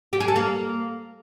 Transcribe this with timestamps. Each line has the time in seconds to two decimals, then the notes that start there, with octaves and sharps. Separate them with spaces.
0.13 G4
0.20 G#4
0.28 A4
0.36 A#3